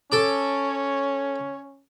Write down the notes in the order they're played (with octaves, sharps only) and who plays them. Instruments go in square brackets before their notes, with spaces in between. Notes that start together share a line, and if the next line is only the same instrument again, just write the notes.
[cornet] C#4 [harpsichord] A4 D6 [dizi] C#5